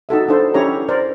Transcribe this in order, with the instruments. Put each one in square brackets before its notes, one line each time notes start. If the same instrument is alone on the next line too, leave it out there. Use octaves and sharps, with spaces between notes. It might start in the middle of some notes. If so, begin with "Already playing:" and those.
[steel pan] D#4 F#4 A4 E5
D4 E4 A4 C5
C#4 E4 G4 C#5 A#5
A#4 C5 D5